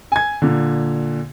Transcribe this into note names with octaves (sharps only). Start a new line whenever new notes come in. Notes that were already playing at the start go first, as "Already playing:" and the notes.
G#5 G#6
A#2 D3